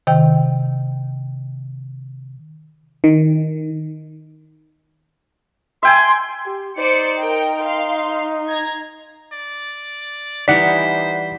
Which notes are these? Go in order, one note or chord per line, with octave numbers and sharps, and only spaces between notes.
C3 D#3 G5
D#3
E5 G5 G#5 C6
G4
D#4 C5 D5 C#7
A#4 G5
F5 C6
A#5 G#6
D5
E3 G3 D#4 C5 D5 F#5 B6